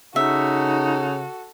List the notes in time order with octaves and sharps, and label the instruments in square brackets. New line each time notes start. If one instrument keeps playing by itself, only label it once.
[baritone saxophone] C#3 [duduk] D#4 [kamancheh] F#4 A4 [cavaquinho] E5